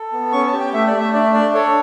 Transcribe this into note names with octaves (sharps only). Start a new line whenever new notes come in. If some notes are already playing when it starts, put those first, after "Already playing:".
Already playing: A4
B3
C#4 C#6
A5
G4
G5
A3 E5
D5
A3
E5
D4 D5
D4 D5
A4 C#5